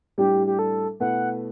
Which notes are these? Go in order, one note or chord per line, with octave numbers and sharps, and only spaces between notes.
A2 G3 D4 G4
G4
A4
B2 A3 E4 B4 F#5